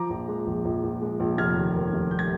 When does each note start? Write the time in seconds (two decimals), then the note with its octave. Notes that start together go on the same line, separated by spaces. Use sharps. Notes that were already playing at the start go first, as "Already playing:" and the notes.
Already playing: F3 A#5 D6
0.10 A#1
0.28 G#3
0.47 A#1
0.65 A#1
0.84 A#1
1.02 G#3
1.20 A#1
1.38 F1 F6 G#6
1.56 D#2
1.75 D#3
1.93 F1
2.11 G3 G6
2.19 G#6